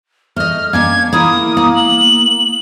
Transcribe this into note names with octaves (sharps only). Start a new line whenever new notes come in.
A3 D#5 F6
A#3 C#4 D4 G#6
A#3 E4 A#4 D#6
A#3
F#7